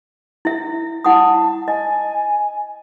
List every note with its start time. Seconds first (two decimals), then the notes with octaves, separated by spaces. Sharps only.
0.45 E4 E5
1.05 E4 F#5 A5 D#6
1.68 D#5 G#5